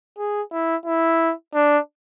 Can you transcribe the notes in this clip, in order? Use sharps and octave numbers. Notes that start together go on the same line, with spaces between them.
G#4
E4
E4
D4